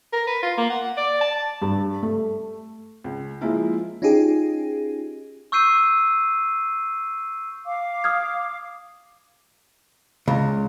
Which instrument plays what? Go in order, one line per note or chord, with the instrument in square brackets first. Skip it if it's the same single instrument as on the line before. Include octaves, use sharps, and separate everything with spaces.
[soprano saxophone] A#4
B4
F4
A#3
F#5
D5
A5
[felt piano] G2
A3
C#2
F3 G#3 A#3 E4 F4
[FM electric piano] C#4 D#4 F4 G4 G#4
[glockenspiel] C#6 E6 G6 C7 D#7
[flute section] F5 D6
[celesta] D#6 F6 G#6
[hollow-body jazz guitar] C#2